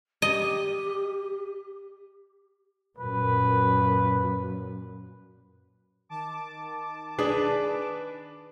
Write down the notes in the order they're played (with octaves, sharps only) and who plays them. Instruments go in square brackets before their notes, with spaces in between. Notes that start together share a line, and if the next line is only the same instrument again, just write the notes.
[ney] G4 [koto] D#5
[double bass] F#2 A#2 [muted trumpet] B4
[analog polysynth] D#3 A5 D6
[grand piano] D4 [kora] G#4 [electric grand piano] B4